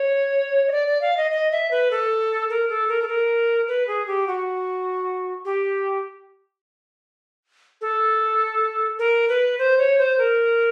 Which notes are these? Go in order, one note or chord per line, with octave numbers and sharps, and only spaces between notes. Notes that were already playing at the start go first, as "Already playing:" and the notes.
Already playing: C#5
D#5
D5
D5
F5
D#5
D#5
E5
B4
A4
A#4
A4
A#4
A4
A#4
B4
G#4
G4
F#4
G4
A4
A#4
B4
C5
C#5
C5
A#4